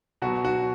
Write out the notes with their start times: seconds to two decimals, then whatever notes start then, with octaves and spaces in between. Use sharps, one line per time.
0.22 B2 F#3 F#4
0.45 F#4